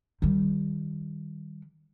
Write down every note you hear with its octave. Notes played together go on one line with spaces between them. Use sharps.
D#3 G3